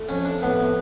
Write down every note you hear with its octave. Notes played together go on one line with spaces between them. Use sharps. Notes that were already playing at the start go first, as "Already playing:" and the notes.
Already playing: A3
F2 C#4
D4
A2 B3